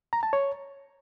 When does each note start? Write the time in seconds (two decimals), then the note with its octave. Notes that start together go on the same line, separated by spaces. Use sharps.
0.13 A#5
0.23 A5
0.33 C#5